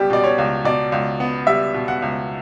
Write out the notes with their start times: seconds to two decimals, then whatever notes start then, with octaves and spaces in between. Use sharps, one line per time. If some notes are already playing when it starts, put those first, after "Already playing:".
Already playing: C#2 G3 B3 G4
0.10 B2 D5
0.24 C#5
0.38 C#2
0.64 B2 D5
0.92 C#2
1.20 B3
1.47 G3 E5
1.74 B2
1.88 F#5
2.02 C#2